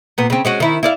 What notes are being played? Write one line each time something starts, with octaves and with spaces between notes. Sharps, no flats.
A#2 B3
C#3 C4
G#3 C#4 F#4
D#3 E4
E4 D5 F5